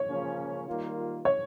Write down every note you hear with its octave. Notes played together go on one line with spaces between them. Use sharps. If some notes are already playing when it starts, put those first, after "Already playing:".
Already playing: C#5
C#3 F3 A#3 C#4
D#3 G3 A#3 F4
C#5